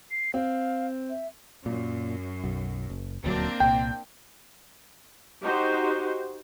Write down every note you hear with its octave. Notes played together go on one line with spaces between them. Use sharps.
C7
C4 F5
E5
F#2 A#2
B1
F#1
D#1 D2 F#3 A#3 C4 D4
C2 A#2 G5
D#4 F#4 G4 C5